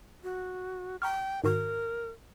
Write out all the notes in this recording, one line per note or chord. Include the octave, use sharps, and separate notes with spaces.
F#4
G5 A#5 C#6 F6
G#2 D#3 F#4 A#4